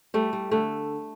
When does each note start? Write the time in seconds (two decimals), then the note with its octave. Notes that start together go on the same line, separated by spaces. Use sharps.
0.14 G3 A3
0.33 G3
0.51 D3 A3